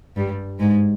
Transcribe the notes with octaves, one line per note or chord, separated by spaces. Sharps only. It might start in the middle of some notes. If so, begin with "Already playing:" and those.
G2 G3
G#2 G#3